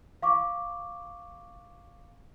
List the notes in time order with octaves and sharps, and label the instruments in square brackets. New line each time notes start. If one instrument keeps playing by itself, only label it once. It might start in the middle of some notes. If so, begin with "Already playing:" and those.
[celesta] F5 C#6 D6